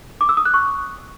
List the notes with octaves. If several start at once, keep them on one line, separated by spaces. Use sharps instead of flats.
D6
E6
D#6
F#6
C#6